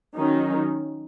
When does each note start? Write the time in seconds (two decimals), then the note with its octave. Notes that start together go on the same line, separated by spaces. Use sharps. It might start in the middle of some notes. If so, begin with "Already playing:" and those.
0.15 D#3 F#3 C#4 D#4